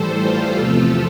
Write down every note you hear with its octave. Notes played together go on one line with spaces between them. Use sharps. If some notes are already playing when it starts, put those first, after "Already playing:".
Already playing: A2 E3 G3 A4 C5
F4 A4
E2 C3 F3 A3 F4 A4